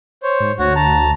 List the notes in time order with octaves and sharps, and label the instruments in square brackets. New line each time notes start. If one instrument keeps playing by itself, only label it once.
[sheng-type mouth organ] C5 C#5
[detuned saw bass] G#2
[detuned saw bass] D2 [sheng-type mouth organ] F#4 C#5 F#5
[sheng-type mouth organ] A5 A#5